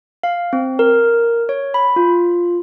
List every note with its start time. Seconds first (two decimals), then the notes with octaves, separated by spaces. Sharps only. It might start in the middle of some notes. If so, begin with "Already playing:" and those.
0.24 F5
0.53 C4
0.79 A#4
1.49 C#5
1.74 B5
1.96 F4